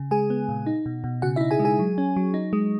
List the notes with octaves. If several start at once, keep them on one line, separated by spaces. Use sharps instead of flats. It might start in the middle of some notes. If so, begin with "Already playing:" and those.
Already playing: C#3
G#3 G#4 G#5
B3
A#2
D#4
B2
B2
C#3 F#4 F#5
E4 E5
D#4
G#4 G#5
G#3
G#4 G#5
F#3
C#4
F#3
D#4
G#3